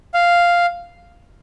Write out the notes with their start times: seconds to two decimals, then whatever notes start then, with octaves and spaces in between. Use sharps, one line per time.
0.14 F5